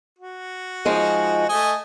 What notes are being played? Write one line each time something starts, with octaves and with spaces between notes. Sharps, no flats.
F#4
F3 G#3 D#4
A3 D#5 G#5